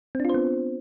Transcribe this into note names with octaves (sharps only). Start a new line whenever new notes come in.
B3 C4 D4 F4 C5